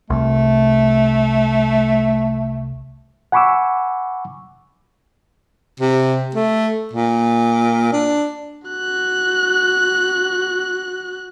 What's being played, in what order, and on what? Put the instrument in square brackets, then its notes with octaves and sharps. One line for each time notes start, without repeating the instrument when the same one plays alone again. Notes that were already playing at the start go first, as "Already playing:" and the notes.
[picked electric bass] C2 [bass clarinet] A3
[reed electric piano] F#5 G#5 B5 C#6 D6 E6
[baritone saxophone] C3
A3
A#2
D4
[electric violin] F#4 F#6